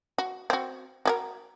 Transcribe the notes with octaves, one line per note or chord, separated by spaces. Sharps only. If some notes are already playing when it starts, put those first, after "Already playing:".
F#4
C4 F#4
F#4 G4 A#4